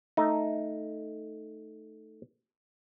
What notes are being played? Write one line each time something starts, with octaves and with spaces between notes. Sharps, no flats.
A3 D#4